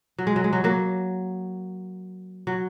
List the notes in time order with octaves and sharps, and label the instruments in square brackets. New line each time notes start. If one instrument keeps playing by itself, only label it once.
[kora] F#3
G#3
F#3
G#3
F#3
F#3 A#3
F#3